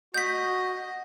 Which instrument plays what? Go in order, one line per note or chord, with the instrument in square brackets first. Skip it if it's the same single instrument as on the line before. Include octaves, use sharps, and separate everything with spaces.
[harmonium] F#4 [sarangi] D#5 [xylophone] G6 B6